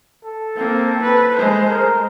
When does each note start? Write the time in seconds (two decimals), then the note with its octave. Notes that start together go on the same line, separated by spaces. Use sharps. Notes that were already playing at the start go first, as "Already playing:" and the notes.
0.25 A4
0.56 A#3 C4
1.03 B4
1.36 G#3 C5
1.69 A#4